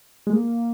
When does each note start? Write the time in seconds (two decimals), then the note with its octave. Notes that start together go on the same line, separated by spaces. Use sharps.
0.27 G#3
0.33 A#3